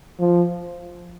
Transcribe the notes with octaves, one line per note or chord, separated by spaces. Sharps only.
F3